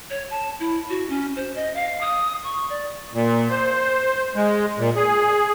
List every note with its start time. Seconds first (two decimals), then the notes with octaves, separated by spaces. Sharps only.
0.10 C#5
0.30 A5
0.60 E4
0.90 F#4
1.10 C#4
1.36 C5
1.56 D#5
1.76 F5
2.01 D#6
2.44 C#6
2.70 D5
3.14 A#2
3.50 C5
4.35 G#3
4.78 A#2
4.96 G#4